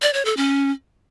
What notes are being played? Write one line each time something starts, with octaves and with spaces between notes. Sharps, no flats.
D5
C#5
A4
C#4